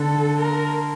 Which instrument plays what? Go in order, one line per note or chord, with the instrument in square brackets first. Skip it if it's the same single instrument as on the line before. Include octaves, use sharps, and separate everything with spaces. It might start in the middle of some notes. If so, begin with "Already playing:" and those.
Already playing: [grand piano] D3 [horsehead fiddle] A4
[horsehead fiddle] A#4